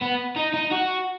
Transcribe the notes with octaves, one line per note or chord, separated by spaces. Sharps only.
B3
D#4
D#4
F#4